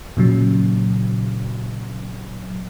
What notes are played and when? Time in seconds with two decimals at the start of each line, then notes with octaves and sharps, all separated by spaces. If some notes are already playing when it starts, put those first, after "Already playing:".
0.17 A#2 C#3 F#3